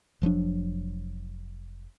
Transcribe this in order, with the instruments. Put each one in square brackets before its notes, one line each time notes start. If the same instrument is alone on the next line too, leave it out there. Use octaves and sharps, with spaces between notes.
[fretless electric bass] F1 F3 F#3 D4